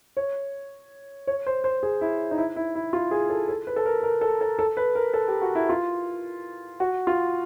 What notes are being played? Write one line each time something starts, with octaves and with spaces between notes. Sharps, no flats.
C#5
C#5
C5
C5
G#4
E4
D#4
E4
E4
E4
F4
G#4
A4
A4
B4
A4
A#4
A#4
A4
A4
A4
B4
A#4
A4
G4
F#4
E4
F4
F#4
F4